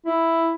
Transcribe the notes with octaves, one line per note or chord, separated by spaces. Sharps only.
E4